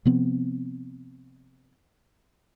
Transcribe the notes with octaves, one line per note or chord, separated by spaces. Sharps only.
C3 F3 B3 C4